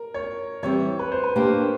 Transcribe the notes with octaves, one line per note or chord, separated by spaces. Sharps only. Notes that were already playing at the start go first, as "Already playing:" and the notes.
Already playing: A#4
C#5
E3 G3 C4 C#5
B4
C5
B4
A#3 D4 G4 A#4 C5